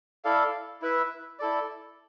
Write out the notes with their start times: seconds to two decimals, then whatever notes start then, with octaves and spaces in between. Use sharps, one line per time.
0.24 E4 A4 D5 F5
0.82 E4 B4 E5
1.39 E4 A4 D5